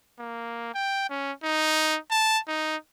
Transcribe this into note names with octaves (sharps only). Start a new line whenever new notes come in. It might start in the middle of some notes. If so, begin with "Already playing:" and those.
A#3
G5
C#4
D#4
A5
D#4